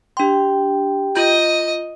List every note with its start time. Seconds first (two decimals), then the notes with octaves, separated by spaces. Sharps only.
0.17 D4 G4 G5 C6
1.16 F4 D#5 G6